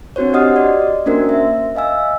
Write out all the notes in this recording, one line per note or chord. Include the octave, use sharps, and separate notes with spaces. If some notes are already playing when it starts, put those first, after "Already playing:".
C4 D4 F#4 C5 C#5
D4 G4 D#5 F#5 D#6 F6
F#4 D5 D#5
A#3 C#4 D4 F#4 A#4 C5
E5
D#5 F5 G#5 E6